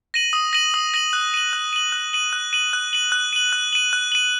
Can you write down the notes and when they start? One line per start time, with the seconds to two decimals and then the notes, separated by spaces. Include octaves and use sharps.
0.14 A#6 D#7 F#7
0.33 D#6
0.53 A#6 D#7 F#7
0.74 D#6
0.94 A#6 D#7 F#7
1.13 F#6
1.34 D#7 F#7
1.53 F#6
1.73 D#7 F#7
1.92 F#6
2.13 D#7 F#7
2.33 F#6
2.53 D#7 F#7
2.73 F#6
2.93 D#7 F#7
3.12 F#6
3.33 D#7 F#7
3.53 F#6
3.73 D#7 F#7
3.93 F#6
4.12 D#7 F#7